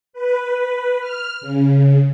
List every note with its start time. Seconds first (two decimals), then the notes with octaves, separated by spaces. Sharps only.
0.13 B4
1.00 F6
1.41 C#3